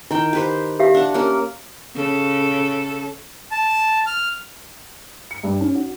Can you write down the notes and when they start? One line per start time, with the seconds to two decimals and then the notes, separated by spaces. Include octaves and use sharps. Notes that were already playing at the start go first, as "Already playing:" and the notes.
0.11 D#3 E4 G5
0.33 G4 B4 C5
0.80 G4 E5 F5
0.95 D4 F#5
1.14 A#3 C#4 A#4
1.96 C#3 A4
3.51 A5
4.06 F6
5.31 C#7
5.43 G2
5.61 C#4
5.75 F#4